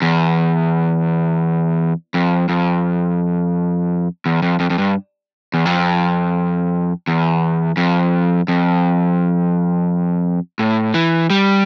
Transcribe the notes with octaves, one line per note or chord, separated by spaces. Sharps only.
E2
F2
F2
E2
F2
F2
F2
G2
E2
F2
E2
F2
F2
A2
E3
G3